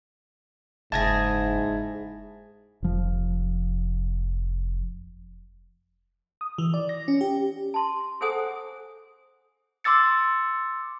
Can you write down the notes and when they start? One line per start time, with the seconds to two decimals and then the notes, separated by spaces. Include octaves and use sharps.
0.92 F#1 G#2 E4 F4 G#4 A5 G#6 A#6
2.82 F1 F3
6.41 D#6
6.58 E3
6.74 D5
6.89 A#6
7.08 C#4
7.21 G4
7.74 A5 C6
8.21 G#4 A4 C5 F#5 G#5 D#6
9.84 C6 D6 E6 A6 C#7